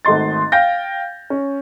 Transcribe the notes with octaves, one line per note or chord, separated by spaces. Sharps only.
G#1 A3 D#5 C6 A6
F5 G5 G6 A#6
C#4